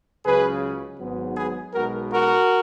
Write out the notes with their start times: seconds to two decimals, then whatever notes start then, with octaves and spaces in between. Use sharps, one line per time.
0.24 C#2 C#3 F#3 G#4 B4
0.99 G#1 G#2 F#3 B3
1.36 G#4 B4
1.74 B1 B2 G#3 F#4 A#4
2.11 F#4 A#4